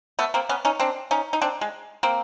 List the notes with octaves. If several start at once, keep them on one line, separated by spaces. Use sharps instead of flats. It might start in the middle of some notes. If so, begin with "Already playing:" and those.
A3 B3
A#3 C4
B3 C#4
C#4 D#4
C4 D4
C#4 D#4
D#4
C4 D4
G#3
A#3 C4